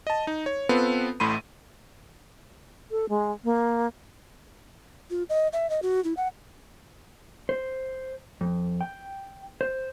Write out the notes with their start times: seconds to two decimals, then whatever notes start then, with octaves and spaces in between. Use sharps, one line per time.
0.07 D#5 A5
0.27 D#4
0.46 C#5
0.69 B3 C4 F4 A4 B4
1.20 A1 A2 A3 B5 C6 D#7
2.91 A4
3.09 G#3
3.44 A#3
5.10 F4
5.29 D#5
5.53 E5
5.70 D#5
5.82 F#4
6.04 E4
6.17 F#5
7.49 C5
8.41 F2
8.81 G5
9.61 C5